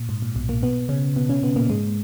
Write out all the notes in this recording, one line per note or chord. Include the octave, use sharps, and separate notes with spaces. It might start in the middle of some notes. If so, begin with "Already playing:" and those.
Already playing: A#2
G#2
A#2
B1 B2
A#2 A#3
B2 B3
C#3 C#4
B2 B3
C#3 C#4
B2 B3
A#2 A#3
G#2 G#3